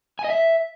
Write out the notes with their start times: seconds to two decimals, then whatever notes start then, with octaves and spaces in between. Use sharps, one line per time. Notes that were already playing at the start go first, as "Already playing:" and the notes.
0.19 G#5
0.24 D#5
0.30 E5